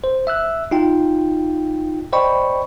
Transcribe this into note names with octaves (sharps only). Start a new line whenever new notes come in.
C5
E5 E6 F#6
D#4 F4 G5
C5 D5 D#5 G5 B5 C#6